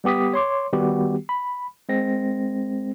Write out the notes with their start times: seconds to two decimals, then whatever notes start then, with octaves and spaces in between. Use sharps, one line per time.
0.04 G3 B3 G4 D#6 B6
0.34 C#5 C6 D6
0.73 D#3 G3 B3 F#4 G4
1.29 B5
1.89 G#3 C4 A#6